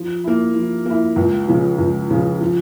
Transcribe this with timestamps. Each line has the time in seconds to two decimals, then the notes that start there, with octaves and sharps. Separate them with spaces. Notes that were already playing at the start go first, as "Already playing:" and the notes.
Already playing: F3
0.24 A#3 E4
0.54 F3
0.86 A#3 E4
1.16 C#2
1.48 C#3 F3
1.78 C#2
2.10 C#3 F3
2.41 F3